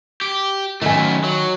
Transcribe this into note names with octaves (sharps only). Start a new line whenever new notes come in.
G4
F#2 D#3 A3 G#5
F#3